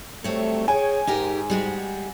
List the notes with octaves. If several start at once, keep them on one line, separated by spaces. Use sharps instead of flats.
F#3 G3 A3 C4 C#5
G#4 C#5 G5 G#5
G#2 D#4 G4 A#4
G3 G#3 F#4